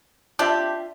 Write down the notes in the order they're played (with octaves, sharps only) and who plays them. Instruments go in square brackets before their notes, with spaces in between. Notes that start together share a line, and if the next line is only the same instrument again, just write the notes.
[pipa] C4 D4 G4 [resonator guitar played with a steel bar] F4 E5 A5